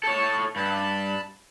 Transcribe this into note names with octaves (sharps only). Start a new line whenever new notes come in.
A4 C#5 A5
G2 A5 B5